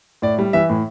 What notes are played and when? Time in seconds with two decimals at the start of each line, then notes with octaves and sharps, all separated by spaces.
0.22 A2 D5
0.38 G3
0.53 E3 E5
0.70 A2